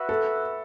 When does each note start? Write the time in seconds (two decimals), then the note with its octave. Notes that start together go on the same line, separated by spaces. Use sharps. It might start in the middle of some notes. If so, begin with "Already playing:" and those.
Already playing: F#4 B4 E5
0.09 A4